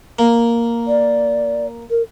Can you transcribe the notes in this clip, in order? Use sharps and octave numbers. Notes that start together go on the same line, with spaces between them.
A#3
D5
A#4